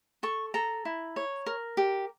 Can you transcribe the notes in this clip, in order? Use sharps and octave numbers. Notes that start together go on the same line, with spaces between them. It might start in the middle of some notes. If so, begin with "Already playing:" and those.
A4 C#6
A4 A#5
E4
C#5
A#4
G4